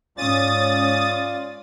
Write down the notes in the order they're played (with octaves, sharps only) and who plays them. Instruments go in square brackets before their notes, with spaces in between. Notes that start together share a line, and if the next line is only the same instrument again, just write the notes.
[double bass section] G#2 C#4 [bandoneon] F4 D5 [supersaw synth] D#6 A6